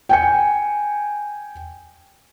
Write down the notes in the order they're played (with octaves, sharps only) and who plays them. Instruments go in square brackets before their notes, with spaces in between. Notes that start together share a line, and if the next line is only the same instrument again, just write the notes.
[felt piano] G5 G#5 C#7